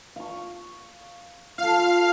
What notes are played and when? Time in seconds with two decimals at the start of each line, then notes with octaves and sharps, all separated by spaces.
0.16 F5 C#6
1.58 F4 A4 F5